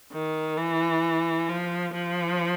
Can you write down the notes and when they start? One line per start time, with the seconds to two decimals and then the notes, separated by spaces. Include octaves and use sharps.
0.13 D#3
0.57 E3
1.49 F3
1.94 F3